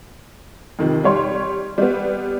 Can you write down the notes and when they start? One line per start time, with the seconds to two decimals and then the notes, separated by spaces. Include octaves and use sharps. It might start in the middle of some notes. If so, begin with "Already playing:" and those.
0.79 F2 C3 D#3
1.04 G3 C#5 C6
1.78 G3 B3